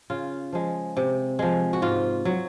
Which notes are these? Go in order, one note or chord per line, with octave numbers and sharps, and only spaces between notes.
C#3 F4
F3 G#3
C3
F3 G#3
F#4
G#2 F4
F#3